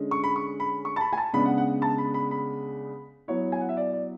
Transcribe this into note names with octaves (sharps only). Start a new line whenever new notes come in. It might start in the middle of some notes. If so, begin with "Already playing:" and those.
Already playing: D3 G#3 C#4
C#6
B5
C#6
B5
C#6
A5
B5
G#5
A5
C#3 G#3 B3 D4 B5
F#5
F#5
A5
B5
B5
B5
F#3 B3 E4 C#5
G#5
F#5
E5
D5
D5